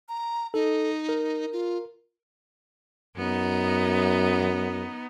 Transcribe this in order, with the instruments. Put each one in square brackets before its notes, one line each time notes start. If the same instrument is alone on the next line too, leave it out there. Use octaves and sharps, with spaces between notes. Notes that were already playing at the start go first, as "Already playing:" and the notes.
[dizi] A#5
[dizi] D#4 [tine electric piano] A4
[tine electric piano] A#4
[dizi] F4
[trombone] F#2 [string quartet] B3 D#4